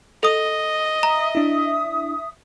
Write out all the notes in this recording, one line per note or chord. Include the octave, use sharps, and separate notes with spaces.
A4 D#5 D#6
E5 A#5 D#6
D4 E4